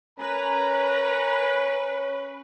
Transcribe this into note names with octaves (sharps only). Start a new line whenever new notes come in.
C#4 A#4 B4 G#5 A#5